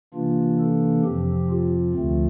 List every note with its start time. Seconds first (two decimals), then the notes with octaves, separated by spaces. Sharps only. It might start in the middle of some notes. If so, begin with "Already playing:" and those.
0.14 C3 E3 A#3 D4 F4
0.59 A4
1.04 F2 C3 F3 C4 G4
1.50 F4
1.94 D2 D3 F3 A3 C4